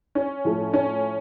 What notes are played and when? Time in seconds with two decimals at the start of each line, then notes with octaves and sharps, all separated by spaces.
0.15 C#4
0.45 A2 F3 A3
0.74 C#4